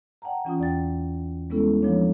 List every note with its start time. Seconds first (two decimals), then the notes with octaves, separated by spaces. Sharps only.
0.22 D5 F#5 G5 A5 A#5
0.45 E3 C#4 F4 D#6
0.59 E2 D5 G5 A6
1.50 G3 G#3 B3 C#4 E4 A4
1.82 F3 A#3 D4 C#5